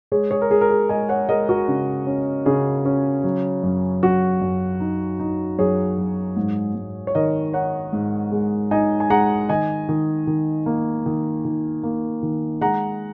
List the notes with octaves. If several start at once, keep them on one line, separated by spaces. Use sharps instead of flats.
G#3 G#4 C#5
G#4 C#5
A#4
G#3 G#4
A#4
G#4
G#3 D#5 G#5
C#5 F#5
G#3 A#4 D#5
F#4 A#4
C#3
C#4
C#3 G#4
C#4
F#3
F#2
F#2 F#4
F#2
D#4
D#4
F#2 G#4 C#5
F#3
G#2
G#2
C#5
D#3 A#4 D#5
D#4 C#5 F#5
G#2
G#3
D#4 D#5 G#5
G#5
G#3 F#5 A#5
D#3 D#5 G#5
D#3
D#3
A#3
D#3
D#3
A#3
D#3
G#3 F#5 A#5